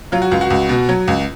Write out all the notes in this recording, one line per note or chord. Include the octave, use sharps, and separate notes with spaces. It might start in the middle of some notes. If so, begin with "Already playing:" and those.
F#3 F4
F#4
C#2 F4
F#4
C#2
B2
F#3
C#2